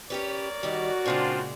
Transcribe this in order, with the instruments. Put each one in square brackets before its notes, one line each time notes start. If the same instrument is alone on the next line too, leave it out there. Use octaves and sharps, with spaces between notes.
[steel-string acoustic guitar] C#4 G4 B4 [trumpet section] A#4 C#5 D5
[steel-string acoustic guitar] D#3 G3 [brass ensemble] F#4
[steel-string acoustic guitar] A#2 C#3 G#3 [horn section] C4 D4 F4